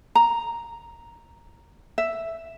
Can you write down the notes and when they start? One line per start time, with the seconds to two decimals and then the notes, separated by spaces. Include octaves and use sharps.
0.15 A#5
1.98 E5